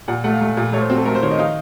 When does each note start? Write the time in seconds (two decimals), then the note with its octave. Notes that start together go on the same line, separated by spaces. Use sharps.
0.08 A#2 F#5
0.24 A3 F#5
0.33 F5
0.41 A3
0.57 A#2
0.73 A3 C#5
0.81 C5
0.90 C4 F#4
0.98 A4
1.06 A3 A#4
1.15 C5
1.23 D#3 C#5
1.31 D#5
1.39 D#4 F5